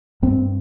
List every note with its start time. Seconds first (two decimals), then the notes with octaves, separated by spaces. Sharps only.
0.22 G2 C4